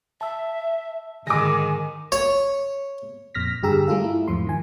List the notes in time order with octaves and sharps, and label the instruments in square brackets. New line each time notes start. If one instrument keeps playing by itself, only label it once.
[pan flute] E5 [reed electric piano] A5 E6
[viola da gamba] G#2 D#3 [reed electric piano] D3 [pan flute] G#5 [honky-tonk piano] D6 A#6
[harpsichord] C#5
[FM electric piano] F2 A#2 F6 A#6 B6
G2 D3 G4 G#4 A#5 E6
G3 A3 F4 G#4 A4 F5
A3 E4
E2 G#2 F3 C6
D#3 G#5